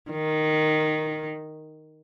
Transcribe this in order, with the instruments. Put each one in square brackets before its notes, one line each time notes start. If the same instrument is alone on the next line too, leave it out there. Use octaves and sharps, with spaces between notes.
[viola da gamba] D#3